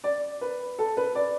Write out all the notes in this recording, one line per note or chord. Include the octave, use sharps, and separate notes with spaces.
D5
B4
A4
B4
D5